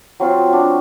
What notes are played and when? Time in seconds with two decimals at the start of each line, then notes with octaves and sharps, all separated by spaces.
0.20 F#3 C4 F4
0.53 D4 F#4